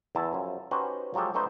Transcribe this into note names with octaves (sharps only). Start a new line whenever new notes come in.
E2 E4 A5
F#2 F3
C#4 D#4 F#4 G4 B4 C5
F3 F#3 G#3 G4 A4
F#3 A3 B3 D#4 C5